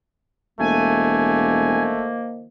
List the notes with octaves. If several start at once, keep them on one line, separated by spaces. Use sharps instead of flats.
E1 D#3 F3 A3 A#3 G#5